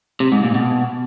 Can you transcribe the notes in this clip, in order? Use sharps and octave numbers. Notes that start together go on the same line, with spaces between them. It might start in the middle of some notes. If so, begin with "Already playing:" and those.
C3
G#2
A#2
B2